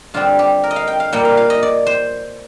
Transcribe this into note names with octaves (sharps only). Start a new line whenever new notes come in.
G2 D3 G3 C4 F4
G4
A#4
D#5
F5
G5
F5
A#2 G3 A#3 G5
F5
F5
D#5
D5
C5